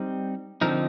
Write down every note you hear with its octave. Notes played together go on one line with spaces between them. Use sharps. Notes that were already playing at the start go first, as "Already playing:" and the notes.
Already playing: G3 C4 D#4
D3 F3 C4 D#4 A#4